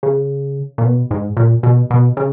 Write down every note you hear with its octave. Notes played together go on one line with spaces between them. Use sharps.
C#3
A#2
B2
G#2
A#2
B2
B2
C#3